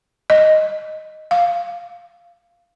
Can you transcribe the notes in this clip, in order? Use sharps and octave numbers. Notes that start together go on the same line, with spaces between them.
D#5
F5